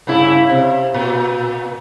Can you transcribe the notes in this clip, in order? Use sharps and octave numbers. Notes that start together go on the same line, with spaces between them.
G2 C#3 E4
C3
A#2